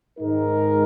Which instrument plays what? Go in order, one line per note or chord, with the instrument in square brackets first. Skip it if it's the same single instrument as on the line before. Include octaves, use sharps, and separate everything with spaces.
[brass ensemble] G#2 D#3 G#3 D#4 A#4